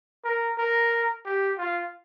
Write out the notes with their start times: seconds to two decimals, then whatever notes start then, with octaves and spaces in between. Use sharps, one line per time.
0.25 A#4
0.58 A#4
1.25 G4
1.58 F4